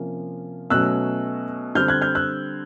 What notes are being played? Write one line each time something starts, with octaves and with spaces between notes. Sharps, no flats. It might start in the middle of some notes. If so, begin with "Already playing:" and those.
Already playing: C3 F3 A#3 C#4
B2 F#3 A3 C#4 E6 F#6
D3 G3 C4 F6 G6
F#6 G#6
F6 G6
E6 F#6